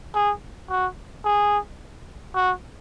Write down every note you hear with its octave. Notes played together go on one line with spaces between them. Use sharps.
G#4
F#4
G#4
F#4